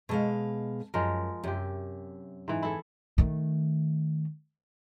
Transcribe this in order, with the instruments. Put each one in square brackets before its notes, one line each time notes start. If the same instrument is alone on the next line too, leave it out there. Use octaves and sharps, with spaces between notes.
[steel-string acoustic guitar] B2 G#3 F5 [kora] A4 C#5
[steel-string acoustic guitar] F#2 [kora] F3 G#3 A#4
[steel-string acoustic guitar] F#2 [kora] C3 G4
[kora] G#2 E3
E4 G#4 A4
[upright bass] D#3 A3